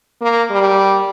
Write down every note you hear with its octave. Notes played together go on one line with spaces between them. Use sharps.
A#3
G3